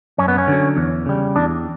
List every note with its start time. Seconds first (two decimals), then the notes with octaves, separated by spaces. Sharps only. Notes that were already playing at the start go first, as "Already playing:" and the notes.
0.18 F#2 C#4
0.28 B3
0.38 C#4
0.48 D3 F#3
0.77 E2
1.06 C#3 G3
1.36 E2 D4